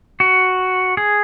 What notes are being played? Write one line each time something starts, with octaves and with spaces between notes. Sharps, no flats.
F#4
G#4